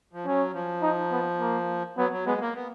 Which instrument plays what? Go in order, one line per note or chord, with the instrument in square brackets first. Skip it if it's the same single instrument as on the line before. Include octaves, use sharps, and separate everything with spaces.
[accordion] F3
[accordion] F#3 [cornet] C#4
[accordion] F3
[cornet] D#4
B3
A#3
[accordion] F#3 [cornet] B3
[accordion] F#3
[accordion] G#3 [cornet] B3
[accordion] A#3
B3